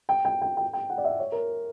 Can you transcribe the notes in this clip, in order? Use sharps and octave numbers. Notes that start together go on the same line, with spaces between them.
G5
G5
G5
G5
G5
F#5
D5
E5
C#5
A#4